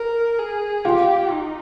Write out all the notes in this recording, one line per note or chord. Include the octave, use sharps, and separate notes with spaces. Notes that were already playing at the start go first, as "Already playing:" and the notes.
Already playing: A#4
G#4
F4 G4
D#4